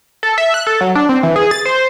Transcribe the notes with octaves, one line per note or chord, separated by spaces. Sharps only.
A4
E5
F#6
A4
F#3
D4
C4
E3
G#4
A6
C5